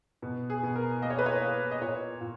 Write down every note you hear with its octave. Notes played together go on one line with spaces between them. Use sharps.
B2
G#4
B2
A#4
A#3 D#5
C#5
B4
C#5
A#3
D#5
A#2 C#5
A#2